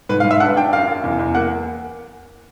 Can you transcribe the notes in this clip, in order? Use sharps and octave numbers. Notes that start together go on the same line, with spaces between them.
G#2 B4
F5
G#2
E5
D4 F#5
D4 G5
F#2 F5
F#2
E2
E2
A#3 F#5